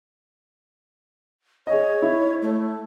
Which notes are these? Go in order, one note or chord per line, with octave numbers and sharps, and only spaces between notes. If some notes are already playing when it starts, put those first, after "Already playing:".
G#4 C#5 D#5
E4
A3